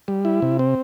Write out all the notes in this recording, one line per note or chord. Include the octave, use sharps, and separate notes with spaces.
G3
E4
C3
C4